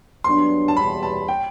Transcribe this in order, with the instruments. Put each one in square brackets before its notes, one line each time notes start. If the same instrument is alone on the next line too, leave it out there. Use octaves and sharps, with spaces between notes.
[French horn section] G2 F#3 B3 D4 [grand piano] C6
[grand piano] A5
[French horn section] E2 B2 G3 [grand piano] B5
[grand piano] A5
G5